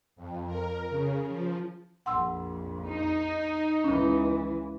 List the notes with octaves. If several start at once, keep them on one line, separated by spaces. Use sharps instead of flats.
F2
A#4
C#3
F3
A#1 F2 F#5 C6 E6
D#4
C#2 E3 C#4